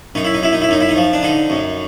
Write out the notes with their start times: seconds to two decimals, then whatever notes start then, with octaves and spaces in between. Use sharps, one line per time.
0.15 F#2 D#4
0.25 E4
0.34 D#4
0.43 F#2 E4
0.53 D#4
0.62 E4
0.69 F#2 D#4
0.81 E4
0.89 D#4
0.96 F3
1.13 D4
1.23 D3 D#4
1.50 F#2